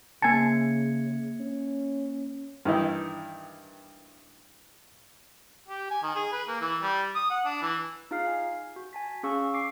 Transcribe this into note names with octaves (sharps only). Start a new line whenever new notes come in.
C#3 A#3 G#5 A5 G#6 C#7
C#4
G2 D#3 E3 D#4 E4
G4
G#5
D#3
G#4
B4
A#3
E3
G3
D#6
F#5
D4
E3
D#4 F4 G#4 F5 F6 C7
G#5
F#4
G#5 A5 B6
C#4 G#4 F5 C#6 E6
D6 C7